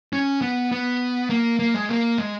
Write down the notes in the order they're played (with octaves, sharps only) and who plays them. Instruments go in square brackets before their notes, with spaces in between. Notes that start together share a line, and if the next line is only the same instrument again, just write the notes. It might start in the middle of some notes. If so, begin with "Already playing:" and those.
[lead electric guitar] C#4
B3
B3
A#3
A#3
G#3
A#3
G#3